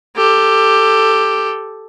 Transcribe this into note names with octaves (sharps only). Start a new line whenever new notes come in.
G4 A4